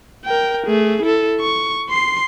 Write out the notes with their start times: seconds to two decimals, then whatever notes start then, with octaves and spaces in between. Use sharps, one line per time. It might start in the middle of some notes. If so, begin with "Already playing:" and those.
0.25 A#4 G5
0.67 A3 G#4
1.03 E4 A4
1.40 C#6
1.90 C6 C7